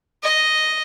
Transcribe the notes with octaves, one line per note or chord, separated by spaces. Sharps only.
D#5